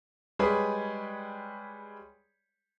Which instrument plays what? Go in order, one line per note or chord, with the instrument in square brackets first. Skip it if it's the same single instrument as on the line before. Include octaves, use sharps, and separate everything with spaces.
[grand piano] G3 G#3 G#4 B4 C#5 D5